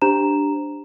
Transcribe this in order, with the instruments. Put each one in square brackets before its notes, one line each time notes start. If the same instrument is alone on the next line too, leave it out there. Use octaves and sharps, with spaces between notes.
[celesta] D4 G4 C5 A#5 E7